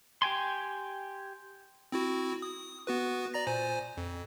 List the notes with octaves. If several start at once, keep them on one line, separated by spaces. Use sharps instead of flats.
G4 G5 G#5 C6
C4 E4 F#4
D#6
B3 F#4 B4
D5 A#5 A#6
A#2 C5 G#5
F2